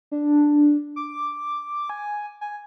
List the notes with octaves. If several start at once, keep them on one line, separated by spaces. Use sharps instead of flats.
D4
D6
G#5
G#5